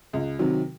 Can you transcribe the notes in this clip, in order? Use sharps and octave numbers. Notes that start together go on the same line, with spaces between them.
C#2
C3 D#3 F#3